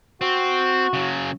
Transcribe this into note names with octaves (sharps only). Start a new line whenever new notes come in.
C4 F#4
C#3 F#3